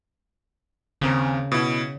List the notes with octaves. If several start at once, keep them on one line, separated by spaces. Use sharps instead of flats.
D#2 C#3 C4 A#4
B2 E4